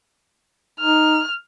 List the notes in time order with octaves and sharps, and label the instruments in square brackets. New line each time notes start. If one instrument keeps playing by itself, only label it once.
[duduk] D#4 [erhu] F6